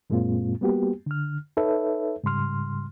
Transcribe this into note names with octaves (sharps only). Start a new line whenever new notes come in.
F#2 A#2 G#3 A#3 C4 F4
G3 A#3 B3 F#4 G4
D3 F6
D#4 A4 B4 C#5 E5
G#2 C#3 G3 C6 F6